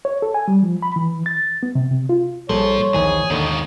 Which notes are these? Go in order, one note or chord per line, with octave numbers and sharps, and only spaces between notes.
C#5
A4
G#5
G3
F3
B5
E3
A6
B3
C3
C3
F4
A#1 F3 G3 A4 C#5
A#1 D#2 E3 G#4
D#2 G#2 B2 D3